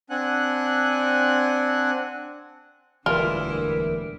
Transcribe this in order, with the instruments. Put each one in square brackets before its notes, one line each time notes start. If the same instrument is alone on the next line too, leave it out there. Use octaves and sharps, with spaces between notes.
[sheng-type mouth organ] C4 D4 F#5 G#5 F#6
[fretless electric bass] E1 D2 E3 [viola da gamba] D3 G3 E4 [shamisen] F4 [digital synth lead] A#4